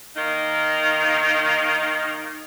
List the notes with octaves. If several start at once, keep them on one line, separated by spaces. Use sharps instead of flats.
D#3 A#3 D#4